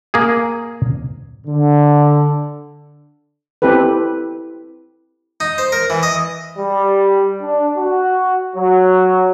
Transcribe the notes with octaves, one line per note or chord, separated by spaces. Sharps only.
A#3 G#4
D3
C4 E4 G4 A4 B4
D#4
C5
A#4
E3
D#5
G3
D4
F#4
F#3